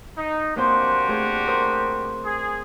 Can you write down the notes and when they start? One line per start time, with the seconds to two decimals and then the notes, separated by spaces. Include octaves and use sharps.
0.17 D#4
0.56 A#3 C4 D4 F#4 G4 C5
1.08 A3 G#4 C5
1.47 A#4 C5 D#6
2.25 G#4